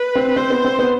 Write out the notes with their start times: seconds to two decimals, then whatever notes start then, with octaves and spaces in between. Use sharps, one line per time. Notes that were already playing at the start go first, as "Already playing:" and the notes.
Already playing: B4
0.15 C4
0.36 C4 C5
0.50 B3
0.65 C4
0.79 B3